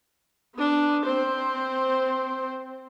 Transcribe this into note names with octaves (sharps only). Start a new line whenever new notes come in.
B3 D4
C4 C5